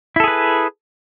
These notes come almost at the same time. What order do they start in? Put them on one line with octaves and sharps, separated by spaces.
E4 A4 G#4 B4